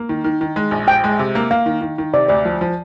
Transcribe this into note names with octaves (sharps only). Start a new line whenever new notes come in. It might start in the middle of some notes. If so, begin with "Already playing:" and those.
Already playing: A#3
D#3
D#3
D#3
G#3
A#1
A#1 G5
G#3
C3
A#3
A#3 F5
D#3
D#3
D#3
C3 D5
D2 D5
F3
F3